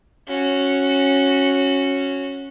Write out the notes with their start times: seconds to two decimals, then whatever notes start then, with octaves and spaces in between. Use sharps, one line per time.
0.28 C#4 F#4